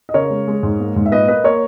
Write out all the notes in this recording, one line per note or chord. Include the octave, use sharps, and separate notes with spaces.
D#5
C#3 A#4 C#5
G#3
G#3
G#2
A#3
G#2
E5
A#2 B4 D#5
A#3 B4 D#5
A#3 A#4 C#5